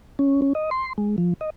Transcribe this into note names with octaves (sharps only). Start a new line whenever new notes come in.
C#4
C#4
D#5
C6
G#3
F3
D#5